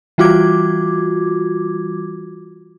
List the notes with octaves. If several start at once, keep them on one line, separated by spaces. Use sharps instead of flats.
E3 G3 F4 F#4 D6 G#6